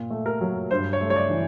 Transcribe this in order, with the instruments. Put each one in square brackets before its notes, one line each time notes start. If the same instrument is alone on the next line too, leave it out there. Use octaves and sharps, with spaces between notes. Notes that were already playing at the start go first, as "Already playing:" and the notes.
Already playing: [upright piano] A#2
A3
A#4
F#3
G2 C5
C#5
A3
C#5
D5
E3